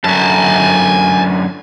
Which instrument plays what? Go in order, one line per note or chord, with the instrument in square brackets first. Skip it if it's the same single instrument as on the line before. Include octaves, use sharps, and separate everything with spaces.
[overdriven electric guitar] F#2 D3 [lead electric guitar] G#5 A5